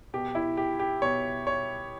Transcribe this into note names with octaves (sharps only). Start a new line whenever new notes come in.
B2 G4
E4
G4
G4
B2 C#5
C#5